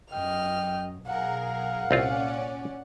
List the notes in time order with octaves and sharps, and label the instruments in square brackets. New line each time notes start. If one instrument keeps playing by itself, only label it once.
[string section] F#2 [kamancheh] D#5 F6 [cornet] G5
[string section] B1 G#4 A#4 [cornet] F5 [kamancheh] F#5
[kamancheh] F#5
[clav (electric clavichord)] C2 C4 F4 [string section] A#2 C#4 D5